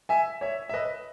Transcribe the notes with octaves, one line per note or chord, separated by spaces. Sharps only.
E5 G#5
C#5 E5
E5
B4 D#5